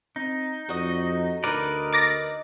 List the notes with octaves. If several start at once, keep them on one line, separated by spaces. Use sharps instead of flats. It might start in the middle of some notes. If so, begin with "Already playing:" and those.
C4 D#4
F2 F#4 D#5
D2 D#4 A#4 B4 D5
D6 A6 A#6